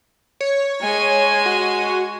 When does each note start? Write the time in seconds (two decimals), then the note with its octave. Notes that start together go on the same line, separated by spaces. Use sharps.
0.41 C#5
0.82 G#3 G#5
1.46 F#4